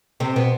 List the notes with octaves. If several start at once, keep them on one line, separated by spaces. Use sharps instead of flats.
C3 C4
B2 B3